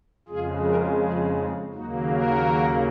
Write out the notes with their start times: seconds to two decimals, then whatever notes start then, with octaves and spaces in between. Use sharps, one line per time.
0.28 F2 C#3 G#3 F4 G#4
0.65 F#4 A#4
1.01 F4 G#4
1.38 D#4
1.74 D#2 C#3 F#3 A#3 D#4 F#4
2.11 F#4 A#4